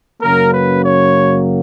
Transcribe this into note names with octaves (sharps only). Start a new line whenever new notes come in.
F#2 C#3 F#3 A#3 A#4
B4
C#5